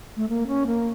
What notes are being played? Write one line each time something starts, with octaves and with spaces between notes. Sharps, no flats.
A3
A#3
C#4
A#3